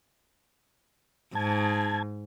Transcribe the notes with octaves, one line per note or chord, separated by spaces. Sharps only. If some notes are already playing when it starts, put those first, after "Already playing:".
G#2 A5 G#6